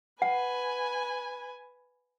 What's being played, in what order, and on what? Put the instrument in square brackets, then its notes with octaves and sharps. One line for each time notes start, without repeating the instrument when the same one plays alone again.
[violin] B4 G#5 [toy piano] F#5